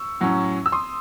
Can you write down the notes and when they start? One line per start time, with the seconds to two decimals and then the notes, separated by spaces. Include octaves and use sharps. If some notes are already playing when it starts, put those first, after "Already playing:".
Already playing: C#6 E6
0.20 A2 F#3 C#4
0.66 E6
0.72 C6 D#6